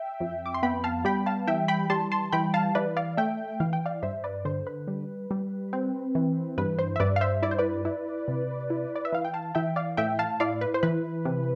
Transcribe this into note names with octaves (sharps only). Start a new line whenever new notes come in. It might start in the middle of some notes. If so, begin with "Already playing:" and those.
Already playing: E5 G5
F2
D6
C6
B3 G5 B5
F5 A5
G3 G5 B5
F5 A5
E3 E5 G5
G5 B5
G3 A5 C6
A5 C6
E3 G5 B5
F5 A5
E3 B4 D5
D5 F5
A3 E5 G5
E3 F5
G5
D5 F5
G2 C5 E5
B4 D5
D3 C5
B4
G3
G3
C4
E3
G2 B4
C5
E5
G2 B4 D5
F5
C5 E5
E4 D5
C5
B4 D5
E4
C3
E4
D5
E5
E3 F5
G5
F5 A5
E3 E5 G5
D5 F5
A2 E5 G5
F5 A5
E4 D5 F5
B4
C5
E3 B4
C3